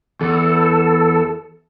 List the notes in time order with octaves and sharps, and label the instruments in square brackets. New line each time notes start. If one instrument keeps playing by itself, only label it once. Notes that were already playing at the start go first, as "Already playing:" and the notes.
[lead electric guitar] E2 [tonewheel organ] A4